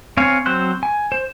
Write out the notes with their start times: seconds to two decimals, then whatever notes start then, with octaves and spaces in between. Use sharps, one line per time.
0.17 C4 C#5 F5 G#5
0.46 F#3 C4 C5 F#6
0.83 G#5
1.12 C5